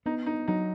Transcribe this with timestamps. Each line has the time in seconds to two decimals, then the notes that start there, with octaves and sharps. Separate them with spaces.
0.06 B3 D#4
0.26 D#4
0.48 F#3 D#4